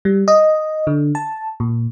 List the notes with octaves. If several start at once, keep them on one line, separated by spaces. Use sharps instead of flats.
G3
D#5
D3
A5
A#2